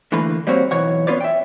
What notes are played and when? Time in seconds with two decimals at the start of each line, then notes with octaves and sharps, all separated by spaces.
0.12 D3 E3 A3 A#3 B4
0.47 G3 A#3 C4 F#4 C#5
0.71 B1 B2 E3 C#5 F#5
1.07 B3 C#4 F4 B4 C#5 D5
1.21 E5 G5